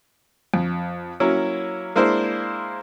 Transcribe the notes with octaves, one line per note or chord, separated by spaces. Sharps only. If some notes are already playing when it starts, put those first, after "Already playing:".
F2
F#3 A#3 C#4 E4
G#3 A#3 D4 E4 C5